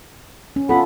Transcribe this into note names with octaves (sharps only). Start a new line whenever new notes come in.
C#4
B3 C#4 F4 A4